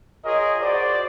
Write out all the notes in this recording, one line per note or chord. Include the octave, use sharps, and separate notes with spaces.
F4 G#4 A#4 C#5 D#5
F#4 C5 D5